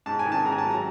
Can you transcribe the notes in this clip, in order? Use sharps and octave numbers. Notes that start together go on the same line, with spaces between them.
G#2 A5
G#5
D#3
A5
G#2 A#5
G#5
A5
F#3
A#5